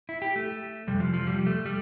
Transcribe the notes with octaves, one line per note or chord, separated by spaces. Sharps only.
E4
G4
A3
F2 C3 G3
F3
F3
G3
A3
G3